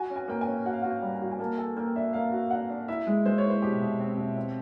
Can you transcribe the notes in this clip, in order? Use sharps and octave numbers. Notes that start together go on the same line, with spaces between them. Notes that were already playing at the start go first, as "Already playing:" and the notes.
Already playing: F#4 G#5
C#4
G#5
A#3 G5
G#5
C#4
F#4 F#5
F5
F#4 F#5
G5
G3
G#5
F#4
G#5
A#3 A5
A4 G#5
A#3 G5
D4 E5
A#3 F5
F#4
D4 F#5
D4
E4 E5
G#3
G#3 C5
C#5
E4
C5
B2 G4
B2
C4
B2
C4